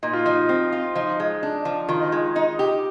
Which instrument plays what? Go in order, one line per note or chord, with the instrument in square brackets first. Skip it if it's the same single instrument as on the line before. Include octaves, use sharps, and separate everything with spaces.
[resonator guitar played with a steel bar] A#2 [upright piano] D#4
[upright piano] F4
[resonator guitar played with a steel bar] F3 [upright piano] D#4
[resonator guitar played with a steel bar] C4
F4
[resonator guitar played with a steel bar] F3 [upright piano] D#4
[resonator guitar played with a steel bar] G#3
D4
F3
[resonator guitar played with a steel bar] D#3 [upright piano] F4
[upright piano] D#4
[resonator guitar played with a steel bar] G#3 [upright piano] F4
[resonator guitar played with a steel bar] D#4
G4